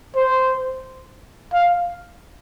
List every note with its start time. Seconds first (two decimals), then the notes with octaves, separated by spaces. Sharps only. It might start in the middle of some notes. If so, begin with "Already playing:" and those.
0.16 C5
1.53 F5